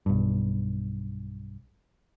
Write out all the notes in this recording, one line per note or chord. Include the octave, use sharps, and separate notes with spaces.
B1 G2